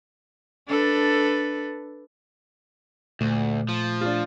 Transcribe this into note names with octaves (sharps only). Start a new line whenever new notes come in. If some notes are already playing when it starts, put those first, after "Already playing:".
D4 A4 B4
D2 A#2 A3
F3
D4 F4